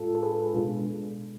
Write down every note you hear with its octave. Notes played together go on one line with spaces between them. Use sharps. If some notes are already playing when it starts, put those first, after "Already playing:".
Already playing: A2 G#3 D4 F4 A4
A4
G#4 B4
B2 G#3 D4 F4